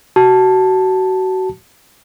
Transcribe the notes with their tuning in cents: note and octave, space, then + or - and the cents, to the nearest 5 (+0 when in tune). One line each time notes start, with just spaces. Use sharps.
F#4 +25 A5 +0